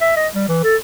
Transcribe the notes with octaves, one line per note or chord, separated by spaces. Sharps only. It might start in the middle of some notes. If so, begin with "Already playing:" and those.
E5
D#5
G3
E3
A4